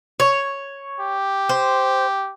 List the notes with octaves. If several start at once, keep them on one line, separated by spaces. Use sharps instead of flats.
C#5
G4
C5